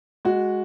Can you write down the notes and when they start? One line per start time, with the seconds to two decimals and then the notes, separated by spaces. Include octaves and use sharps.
0.25 G#3 F#4